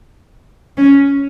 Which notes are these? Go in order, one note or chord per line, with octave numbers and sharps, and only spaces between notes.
C#4